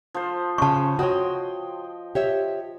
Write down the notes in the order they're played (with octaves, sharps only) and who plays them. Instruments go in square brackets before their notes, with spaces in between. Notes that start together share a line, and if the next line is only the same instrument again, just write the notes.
[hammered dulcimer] F3 C5
[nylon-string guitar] C#3 C#4 [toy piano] A5 C#6
[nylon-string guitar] F#4 C#5 [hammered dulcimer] D#5 G5 C6
[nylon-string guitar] G4 C#5 E5